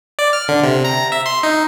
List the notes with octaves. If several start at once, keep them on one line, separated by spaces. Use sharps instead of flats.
D5
F6
D3
C3
A#5
E5
C6
D#4